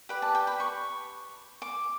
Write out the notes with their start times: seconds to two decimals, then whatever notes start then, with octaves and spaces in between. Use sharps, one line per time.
0.09 G4 B4 D5
0.22 A5
0.35 G5
0.47 B5
0.60 C#6
1.62 D6